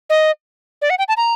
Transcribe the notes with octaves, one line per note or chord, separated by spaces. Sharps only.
D#5
D5
F#5
G5
A5
A#5